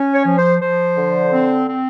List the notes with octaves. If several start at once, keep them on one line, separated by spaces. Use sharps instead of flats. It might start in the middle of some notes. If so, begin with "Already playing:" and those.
Already playing: C#4
C#5
F3
C5
F3 C5
D3
C4
C4